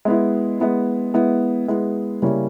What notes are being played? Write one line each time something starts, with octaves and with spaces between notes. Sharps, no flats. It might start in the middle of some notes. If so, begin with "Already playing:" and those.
G#3 B3 E4
G#3 B3 E4
G#3 B3 E4
G#3 B3 E4
C#3 G3 A#3 C#4 E4